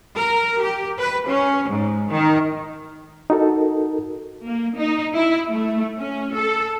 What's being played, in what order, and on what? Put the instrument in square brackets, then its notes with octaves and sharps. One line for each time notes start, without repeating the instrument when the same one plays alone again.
[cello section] A#4
G4
B4
C#4
G#2
D#3
[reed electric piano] D#4 F#4 A4 A#4
[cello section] A#3
D#4
E4
A3
C#4
A4